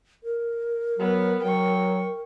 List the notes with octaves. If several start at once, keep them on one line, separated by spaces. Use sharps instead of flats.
A#4
F#3 B3
F#3 G5 C#6